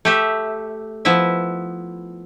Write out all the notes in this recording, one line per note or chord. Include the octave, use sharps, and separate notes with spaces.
A3 G4 E5
F3 B3 E4 E5